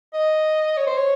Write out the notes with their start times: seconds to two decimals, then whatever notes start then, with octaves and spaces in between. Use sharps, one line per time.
0.14 D#5
0.77 C#5
0.87 C5
0.97 C#5